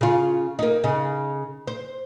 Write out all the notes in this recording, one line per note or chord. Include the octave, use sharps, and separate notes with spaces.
C#3 F4
A#3 D#4
C#3 D#4
C5